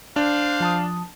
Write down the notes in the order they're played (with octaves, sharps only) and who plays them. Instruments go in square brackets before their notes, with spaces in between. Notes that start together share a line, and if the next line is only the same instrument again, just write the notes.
[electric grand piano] D4 [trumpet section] C5 F5
[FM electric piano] F3 A5 D#6